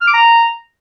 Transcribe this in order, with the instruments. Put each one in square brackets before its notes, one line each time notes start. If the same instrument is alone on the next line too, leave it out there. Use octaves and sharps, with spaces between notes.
[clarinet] F6
D6
A#5